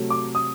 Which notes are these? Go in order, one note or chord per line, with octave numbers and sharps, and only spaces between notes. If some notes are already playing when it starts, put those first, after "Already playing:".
Already playing: C3 F#3 A3
D6
D#6